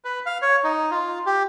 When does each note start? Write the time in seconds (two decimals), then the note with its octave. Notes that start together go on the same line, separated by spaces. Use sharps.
0.05 B4
0.26 F5
0.42 C#5
0.64 D#4
0.91 F4
1.26 G4